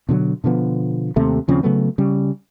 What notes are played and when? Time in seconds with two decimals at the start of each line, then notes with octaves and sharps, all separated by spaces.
0.09 B2 D3 F3 F#3
0.44 B2 D3 F3 B3
1.16 D#2 C3 A3
1.48 D#2 C#3 F3 C4
1.63 C#3 F#3 A3 B3
1.98 C#3 G3